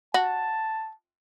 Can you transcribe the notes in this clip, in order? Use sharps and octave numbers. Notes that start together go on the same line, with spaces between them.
F#4 A5